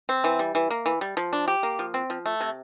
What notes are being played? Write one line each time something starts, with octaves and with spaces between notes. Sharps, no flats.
C4
E3
G3
E3
A#3
E3
G3
F3
D4
G4
A#3
F3
C4
F3
A3
C3